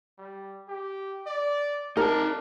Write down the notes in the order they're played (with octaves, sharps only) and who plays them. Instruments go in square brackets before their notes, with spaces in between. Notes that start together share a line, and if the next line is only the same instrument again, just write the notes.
[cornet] G3
G4
D5
[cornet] D4 [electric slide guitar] D#4 A5 [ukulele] A#4